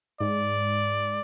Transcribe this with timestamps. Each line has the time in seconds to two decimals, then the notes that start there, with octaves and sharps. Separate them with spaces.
0.21 G#2 D5